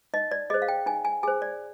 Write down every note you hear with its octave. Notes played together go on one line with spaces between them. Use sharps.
D#4 D#5
D5
G#4 C5 D#5
F5
G5
D#4 G#5
G#5
G#4 C5 G#5
D5